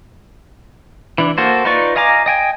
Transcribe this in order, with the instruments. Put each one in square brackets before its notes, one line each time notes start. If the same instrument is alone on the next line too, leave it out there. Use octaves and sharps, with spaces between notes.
[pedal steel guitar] E3 D4
A#3 F#4 A4 C5
D#4 F4 B4 D5 C#6
D#5 F5 G#5 A#5 D6
D#5 G5 G#5